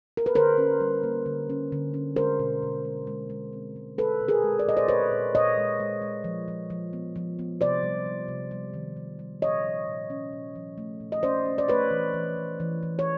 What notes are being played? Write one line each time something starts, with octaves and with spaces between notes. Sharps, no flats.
A#4
B4
D3 A#4 C5
C#4
G3
A#3
D3
C#4
D3
C#4
G#3 A#4 C5
B2
B2
G#3
G#3
G#3
C4
G#3
G#3 A4 B4
A#2
G#4 A#4
G#3
D5
A#2 D#5
C5 D5
A#2 B4 C#5
A#2
A#2 C#5 D#5
G#3
G#3
G#3
F3
F3
F3
B3
F3
B3
C3 C5 D5
G3
G3
C3
G3
D#3
C3
G3
A#2 C#5 D#5
F3
A#2
C#4
A#2
F3
A3
A#2
D#5
C#4 C5 D5
C#4
D5
A3 B4 C#5
E3
E3
E3
E3
E3
C#5